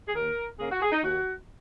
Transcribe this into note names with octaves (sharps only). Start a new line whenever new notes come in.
G#4
D#2 A#4
C#3 A#3 C#4 G#4
F#4
G#4
D#4
D#2 F#4